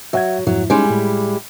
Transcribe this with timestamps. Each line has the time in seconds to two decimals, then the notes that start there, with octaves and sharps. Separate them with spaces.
0.13 F#3 E5 F#5 G#6
0.47 F2 G#2 F#3 E4
0.70 G3 G#3 C#4 D#4 E4
0.90 A2